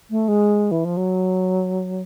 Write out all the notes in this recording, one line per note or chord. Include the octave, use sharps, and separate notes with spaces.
A3
G#3
E3
F3
F#3